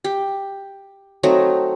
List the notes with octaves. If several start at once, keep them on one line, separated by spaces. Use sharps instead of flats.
G4
F#3 A3 C4 D#4